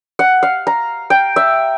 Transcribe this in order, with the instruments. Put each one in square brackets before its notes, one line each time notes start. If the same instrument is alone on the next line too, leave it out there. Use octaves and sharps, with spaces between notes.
[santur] F#5
F5
A#5
G5
E5